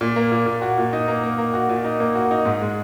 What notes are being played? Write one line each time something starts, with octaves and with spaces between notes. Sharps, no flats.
A#2
A#3
A#2
A#2
F#4
A#2
D#4
A#3
A#3
A#3
F#4
A#2
D#4
A#3
F#4
D#4
G#2
G#3